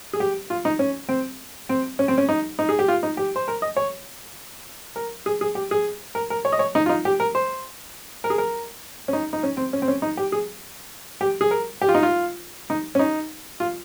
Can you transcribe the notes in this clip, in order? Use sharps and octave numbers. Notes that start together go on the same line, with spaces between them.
G#4
G4
F4
D#4
C#4
C4
C4
C#4
C4
C#4
D#4
D#4
G#4
G4
F4
D#4
G4
C5
A#4
D#5
C#5
A#4
G#4
G#4
G4
G#4
A#4
A#4
C#5
D#5
C#5
D#4
F4
D#4
G4
A#4
C5
A#4
G#4
A#4
C#4
D#4
D#4
C#4
C4
C#4
C4
C#4
D#4
G4
G#4
G4
G#4
A#4
G4
F4
D#4
F4
D#4
C#4
D#4
F4